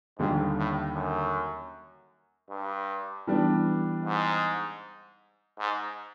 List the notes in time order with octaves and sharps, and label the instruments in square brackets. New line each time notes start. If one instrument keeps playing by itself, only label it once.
[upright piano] D#2 D3 G3 [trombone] G#2
[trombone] A2
F#2
G2
[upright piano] E3 G3 B3 D4
[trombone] G#2
G#2